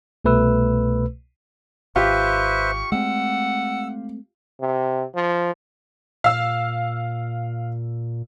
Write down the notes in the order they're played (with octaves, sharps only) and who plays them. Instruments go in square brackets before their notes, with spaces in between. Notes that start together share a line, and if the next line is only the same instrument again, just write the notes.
[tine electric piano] C2 B2 A3 B4 E6
[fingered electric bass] G#1 [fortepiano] F4 G4 [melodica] B4 C5 E5 [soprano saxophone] C#6
[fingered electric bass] G#3 A3 C4 [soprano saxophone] F#5 [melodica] E6
[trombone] C3
F3
[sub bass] A#2 [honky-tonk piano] F5 E6